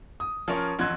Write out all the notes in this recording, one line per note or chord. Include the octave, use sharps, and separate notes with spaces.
D#6
F3 C#4 A#4 C#5 C#6
A1 F2 C6 F#6 G#6